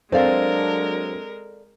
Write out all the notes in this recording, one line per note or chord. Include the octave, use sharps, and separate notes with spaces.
F#3 G#3 C4 D4 A4 A#4 D5 F5